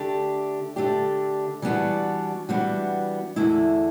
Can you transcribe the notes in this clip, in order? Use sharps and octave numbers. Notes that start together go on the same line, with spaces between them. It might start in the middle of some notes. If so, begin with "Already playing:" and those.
Already playing: D3 A3 D4 G4
D3 A3 D4 G4
E3 G3 B3 D4 F#4
E3 G3 B3 D4 F#4
E2 D3 A3 E4